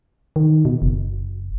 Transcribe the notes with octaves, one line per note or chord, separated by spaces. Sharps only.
D#3
B2
F#1